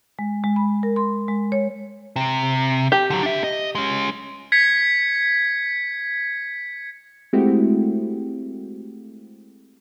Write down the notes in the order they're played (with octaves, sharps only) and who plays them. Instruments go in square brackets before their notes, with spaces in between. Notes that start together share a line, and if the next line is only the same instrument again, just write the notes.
[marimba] G#3
G#3
B5
A#4
C6
G#3
C#5
[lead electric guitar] C3
[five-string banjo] G4
[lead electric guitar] D3 F#3
D4 E5
D#5
G#3 C#4
[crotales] G#6 B6 C#7
[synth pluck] G#3 A3 C4 E4 F#4 G4